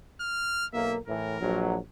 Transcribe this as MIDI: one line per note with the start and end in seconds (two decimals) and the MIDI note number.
0.21 0.66 89
0.73 0.98 35
0.73 0.98 58
0.73 0.96 76
1.08 1.36 45
1.08 1.36 52
1.08 1.63 70
1.40 1.76 34
1.40 1.76 54